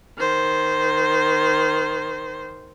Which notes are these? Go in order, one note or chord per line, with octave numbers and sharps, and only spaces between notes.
D#3 C5